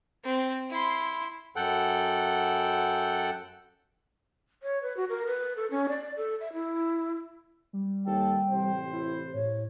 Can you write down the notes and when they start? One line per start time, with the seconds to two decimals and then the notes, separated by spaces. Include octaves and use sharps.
0.24 C4
0.70 E4 C6
1.56 F#2 A4 F#5 G5
4.63 C#5
4.83 B4
4.97 F#4
5.10 A#4
5.27 B4
5.57 A4
5.71 C#4
5.89 D5
6.17 A4
6.40 E5
6.53 E4
7.73 G3
8.06 D#2 A4 G5
8.49 A1 C3 C5
8.92 E4
9.34 A2 C#5